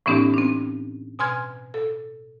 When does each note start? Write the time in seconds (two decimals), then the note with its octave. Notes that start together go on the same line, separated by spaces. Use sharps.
0.06 A2 E3 B3 C#4 D#4 G4
0.34 C4 D4
1.19 B2 G#5 C6 F6 G#6
1.74 A4